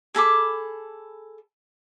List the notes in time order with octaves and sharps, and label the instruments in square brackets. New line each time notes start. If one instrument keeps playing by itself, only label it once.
[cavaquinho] G#4 A4 B5 D6